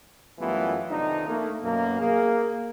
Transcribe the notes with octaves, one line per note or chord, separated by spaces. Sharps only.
F#2 E3 G3 A3 B3 F4
F2 C3 D#3 D4 D#4
A3 A#3
F#2 B2 A#3
A#3 G#4